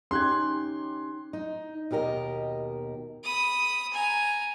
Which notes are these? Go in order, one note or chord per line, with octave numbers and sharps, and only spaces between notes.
C#4 D#4 G4 C6 F#6 G#6
D#4
D#2 B2 G4 A#4 D#5
B5 D#6
G#5 A#5